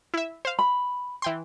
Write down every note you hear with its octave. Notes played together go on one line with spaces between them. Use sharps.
E4 E5
C5 F5
B5
E3 G5 C6